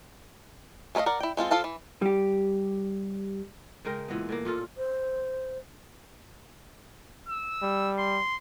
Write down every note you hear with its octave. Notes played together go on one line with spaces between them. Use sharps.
A3 G#4 A#4 D#5 F5
A#4 D5 F#5
E4 G5
G#3 C4 F4 A4
F3 F4 A4 F5 A5
E3
G3 G4
C#3 G#3 A#4 G5
A#2 E3 G#3 B3
A2 E3 A#3
A#2 C#4 F4 A4
C5
E6
G3
C6